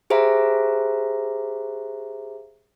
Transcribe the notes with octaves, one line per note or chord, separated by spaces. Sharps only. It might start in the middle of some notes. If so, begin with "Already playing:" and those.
G4 G#4 C5 E5 F5 A#5